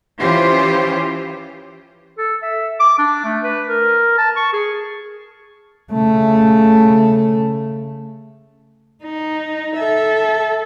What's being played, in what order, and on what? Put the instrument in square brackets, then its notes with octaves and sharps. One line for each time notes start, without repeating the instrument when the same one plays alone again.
[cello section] E3 C#4 F4 G4 C5
[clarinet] A4
E5
D6
D4
A3
B4
A#4
A5
C#6
G#4
[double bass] C#3 A3
[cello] D#4
A4 E5